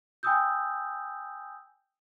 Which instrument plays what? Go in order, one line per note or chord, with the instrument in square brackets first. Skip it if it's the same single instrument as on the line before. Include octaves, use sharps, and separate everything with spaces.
[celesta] G5 G#5 B5 D#6 E6 G6